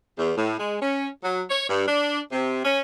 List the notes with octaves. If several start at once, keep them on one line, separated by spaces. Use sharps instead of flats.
E2
A2
G#3
C#4
F#3
C#5
G2
D4
C3
C#4